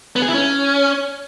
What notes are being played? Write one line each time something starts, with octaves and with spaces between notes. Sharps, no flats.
B3
G#4
E4
C#4